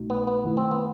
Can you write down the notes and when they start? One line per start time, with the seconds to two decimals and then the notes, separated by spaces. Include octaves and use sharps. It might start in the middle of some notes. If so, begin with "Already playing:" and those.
Already playing: C2 B2 A3 D#4 F#4
0.10 B3
0.27 B3
0.43 F#2 D#3 A3 E4
0.57 C4
0.71 B3